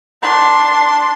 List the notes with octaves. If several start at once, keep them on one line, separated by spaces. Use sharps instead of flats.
D4 C6